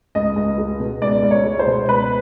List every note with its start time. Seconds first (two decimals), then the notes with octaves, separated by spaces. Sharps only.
0.15 C#2 D#5
0.36 C#2
0.58 G#3
0.80 B2
1.02 C#2 D5
1.23 C#2
1.31 C#5
1.44 G#3
1.59 C5
1.67 B2
1.88 C#2 B4